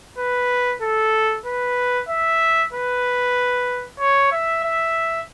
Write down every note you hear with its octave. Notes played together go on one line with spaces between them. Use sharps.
B4
A4
B4
E5
B4
C#5
E5
E5